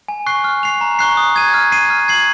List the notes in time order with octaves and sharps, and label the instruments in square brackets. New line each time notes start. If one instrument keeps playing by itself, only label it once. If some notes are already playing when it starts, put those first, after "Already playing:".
[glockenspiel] G#5
C#6 F#6 C7
F6
C7 F7
A#5
C#6 F#6 C7
D#6
G#6 D#7
F6
C7 D#7
F6
G#6 C7 F#7